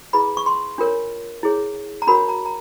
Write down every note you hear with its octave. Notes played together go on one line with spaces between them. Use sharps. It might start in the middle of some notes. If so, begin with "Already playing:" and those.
E4 G#4 B4 B5
C#6
C6
D4 F4 A#4 C#5
E4 G#4 C#5
A#5
D4 F#4 A#4 C#5 B5
A#5
A#5